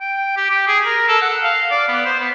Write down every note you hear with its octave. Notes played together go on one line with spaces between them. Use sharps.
G5
G4
G4
G#4
A#4
A4
F#5
F5
D5
B3
C5
B3